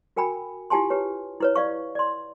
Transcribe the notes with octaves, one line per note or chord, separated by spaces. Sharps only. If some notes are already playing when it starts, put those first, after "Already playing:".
F#4 A#4 G5 G#5 B5
E4 F4 G4 G#5 A5 C6
G4 B4 C#5
E4 B4 C#5
D5 F5 C#6
D5 C6